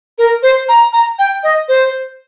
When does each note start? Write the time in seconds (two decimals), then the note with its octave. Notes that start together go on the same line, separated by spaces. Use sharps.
0.18 A#4
0.43 C5
0.69 A#5
0.93 A#5
1.19 G5
1.43 D#5
1.68 C5